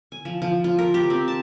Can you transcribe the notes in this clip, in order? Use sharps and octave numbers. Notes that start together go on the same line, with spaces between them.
G#5
F3
F3
F4
A#4
G4
C4
A5